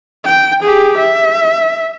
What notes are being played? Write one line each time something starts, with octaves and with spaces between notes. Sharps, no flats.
G5
G4 G#4
E5